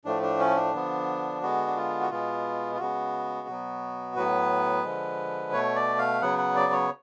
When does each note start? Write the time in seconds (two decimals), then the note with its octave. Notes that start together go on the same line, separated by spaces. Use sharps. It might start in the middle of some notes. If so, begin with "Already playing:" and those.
0.05 A2 F3 A3 D4
0.22 D4
0.40 C#4
0.56 D4
0.73 D3 F3 B3
1.42 D3 G#3 B3 F#4
1.67 D4
1.77 F4
2.01 F#4
2.10 B2 G#3 B3 F4
2.75 F4
2.79 C#3 G#3 B3 F#4
3.48 B2 F#3 B3
4.16 A2 F#3 B3 B4
4.84 D3 F3 G#3
5.53 B2 A3 C#5
5.76 D5
5.99 F5
6.22 C#3 F#3 B3 F#5
6.38 F#5
6.56 D5
6.72 C#5